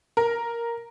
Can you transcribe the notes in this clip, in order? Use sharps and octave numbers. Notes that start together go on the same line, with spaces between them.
A#4